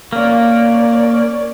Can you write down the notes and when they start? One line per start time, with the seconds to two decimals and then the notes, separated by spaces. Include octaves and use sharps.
0.13 A#3 C#4 D5